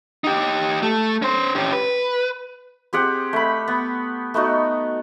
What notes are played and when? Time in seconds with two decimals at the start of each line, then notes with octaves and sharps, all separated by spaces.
0.24 D#4 G4
0.83 A3
1.22 C#4 C5
1.55 C#4 G4
1.72 B4
2.93 C4 G4 G#4 F#5
3.33 A3 B5
3.68 B3
4.34 A3 B3 D#4 F#4